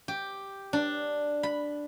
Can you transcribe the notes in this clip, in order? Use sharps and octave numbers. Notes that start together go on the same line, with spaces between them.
G4
D4
B5